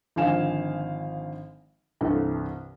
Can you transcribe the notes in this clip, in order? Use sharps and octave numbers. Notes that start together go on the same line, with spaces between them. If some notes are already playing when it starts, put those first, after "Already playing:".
G#1 D3 F3 F5 G#5 E7
C2 G2 E3 A4